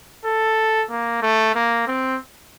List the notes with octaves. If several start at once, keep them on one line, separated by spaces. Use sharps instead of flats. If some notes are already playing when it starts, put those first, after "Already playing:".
A4
A#3
A3
A#3
C4